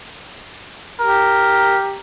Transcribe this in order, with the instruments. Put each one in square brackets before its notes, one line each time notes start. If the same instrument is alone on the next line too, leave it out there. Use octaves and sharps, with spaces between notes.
[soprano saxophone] G4 [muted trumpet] A#4